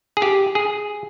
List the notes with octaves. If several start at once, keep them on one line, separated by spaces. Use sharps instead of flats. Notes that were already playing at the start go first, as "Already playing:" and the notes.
G#4
G4
G#4